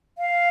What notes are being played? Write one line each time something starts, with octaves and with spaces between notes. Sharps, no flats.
F5